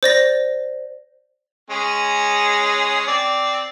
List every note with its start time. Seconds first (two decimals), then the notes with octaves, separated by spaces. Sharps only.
0.03 C5 D5 A#6
1.70 G#3 C#4 G#4
3.07 C4 D5